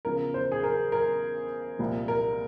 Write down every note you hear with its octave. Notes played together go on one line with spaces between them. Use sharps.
E2 C#3 F3 A#4
C5
G#4
A#4
A#4
C2 A#2 F3
A#4